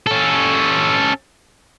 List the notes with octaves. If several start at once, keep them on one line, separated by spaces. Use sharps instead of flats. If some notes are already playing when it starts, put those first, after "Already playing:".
C#4 A4